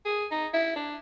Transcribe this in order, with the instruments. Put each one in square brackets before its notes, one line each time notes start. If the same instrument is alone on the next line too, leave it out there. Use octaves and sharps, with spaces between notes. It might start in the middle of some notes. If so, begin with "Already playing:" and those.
[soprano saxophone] G#4
D#4
E4
D4